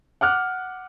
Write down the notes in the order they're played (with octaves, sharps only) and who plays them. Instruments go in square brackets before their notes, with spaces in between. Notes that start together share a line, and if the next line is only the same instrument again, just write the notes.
[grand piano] F#5 D6 F6 F#6